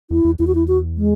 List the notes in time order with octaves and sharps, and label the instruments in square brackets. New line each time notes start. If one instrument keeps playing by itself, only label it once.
[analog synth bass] E2 [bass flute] E4
[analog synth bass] E2
[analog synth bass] E2 [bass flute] E4
[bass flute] F#4
E4
F#4
G#3